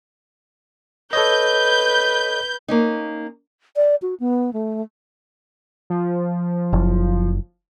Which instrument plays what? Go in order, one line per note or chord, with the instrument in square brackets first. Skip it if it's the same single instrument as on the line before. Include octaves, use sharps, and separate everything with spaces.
[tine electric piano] A4 C#5 D#5 [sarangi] B4 [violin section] G6
[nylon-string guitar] A#3 C#4 D#4
[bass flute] D5
F#4
B3
A3
[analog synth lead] F3
[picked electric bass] F#1